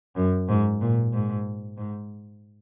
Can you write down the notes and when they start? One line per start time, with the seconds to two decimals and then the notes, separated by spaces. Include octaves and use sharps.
0.16 F#2
0.49 G#2
0.81 A#2
1.13 G#2
1.78 G#2